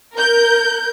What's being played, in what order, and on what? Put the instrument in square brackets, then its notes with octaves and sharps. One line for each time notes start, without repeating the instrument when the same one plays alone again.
[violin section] A#4 G6